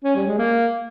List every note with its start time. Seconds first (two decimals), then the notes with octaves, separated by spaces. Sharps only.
0.04 C#4
0.15 G3
0.27 G#3
0.38 A#3